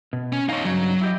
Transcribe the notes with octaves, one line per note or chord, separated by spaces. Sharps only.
B2
C#4
D#4 C#5 F5 G#5
G2 C#3 F#3 D#4
E4 G4 D#5